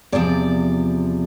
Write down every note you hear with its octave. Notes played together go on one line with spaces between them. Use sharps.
E2 C3 F3 D5